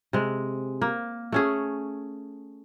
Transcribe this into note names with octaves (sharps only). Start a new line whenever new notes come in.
C3 G#3
A#3
A3 C#4 G#4